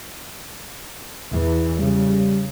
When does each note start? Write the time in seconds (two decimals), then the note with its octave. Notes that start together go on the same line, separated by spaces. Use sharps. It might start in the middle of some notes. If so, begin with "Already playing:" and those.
1.30 E2 E3
1.79 C#3 G3